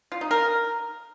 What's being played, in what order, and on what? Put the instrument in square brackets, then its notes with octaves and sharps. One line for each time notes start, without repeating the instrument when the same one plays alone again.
[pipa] F4
D#4
A#4